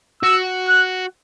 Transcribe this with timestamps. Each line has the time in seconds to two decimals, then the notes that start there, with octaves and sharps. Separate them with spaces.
0.23 F#4 E6
0.68 F#6